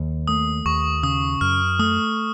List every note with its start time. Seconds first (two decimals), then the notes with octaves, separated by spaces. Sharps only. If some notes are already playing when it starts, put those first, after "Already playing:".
Already playing: D#2
0.28 A3 D#6
0.65 D#2 C#6
1.03 C#3 D#6
1.41 F#2 F6
1.79 A3 D#6